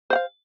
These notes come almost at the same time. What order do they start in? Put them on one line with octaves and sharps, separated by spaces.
C5 F#5 F5